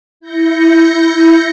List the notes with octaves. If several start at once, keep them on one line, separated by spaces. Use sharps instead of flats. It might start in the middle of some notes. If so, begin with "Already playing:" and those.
E4 G6 A#6 C#7